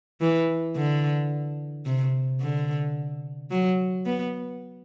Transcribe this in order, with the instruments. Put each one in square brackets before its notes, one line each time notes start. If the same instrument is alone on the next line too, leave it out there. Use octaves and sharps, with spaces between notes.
[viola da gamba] E3
D3
C3
D3
F#3
B3